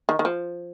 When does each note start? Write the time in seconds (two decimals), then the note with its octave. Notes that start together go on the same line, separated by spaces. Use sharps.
0.09 D#3
0.19 D#3
0.25 F3